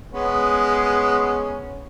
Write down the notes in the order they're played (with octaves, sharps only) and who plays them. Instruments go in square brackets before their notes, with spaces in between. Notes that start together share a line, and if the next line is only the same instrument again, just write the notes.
[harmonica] G#3 B3 C#4